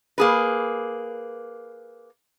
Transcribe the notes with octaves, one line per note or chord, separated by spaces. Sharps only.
A#3 G#4 B4